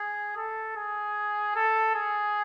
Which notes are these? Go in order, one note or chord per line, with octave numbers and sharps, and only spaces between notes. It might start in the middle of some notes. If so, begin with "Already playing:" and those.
Already playing: G#4
A4
G#4
A4
G#4